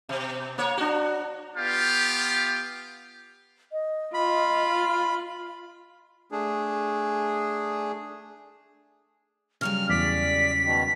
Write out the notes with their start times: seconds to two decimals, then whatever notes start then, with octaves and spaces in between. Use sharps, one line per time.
0.09 B2
0.58 A#3 C#5
0.77 D4 F#4
1.56 B3 F4 G4 F5 G5
3.72 D#5
4.14 F4 B5
6.32 A3 D4 G#4
9.61 C#3 F#3 G3 F6
9.89 E2 D5 B6
10.63 B2 D#3